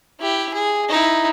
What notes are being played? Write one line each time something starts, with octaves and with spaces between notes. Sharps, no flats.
E4 G4
G#4
D#4 E4